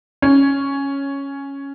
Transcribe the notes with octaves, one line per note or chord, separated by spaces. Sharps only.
C#4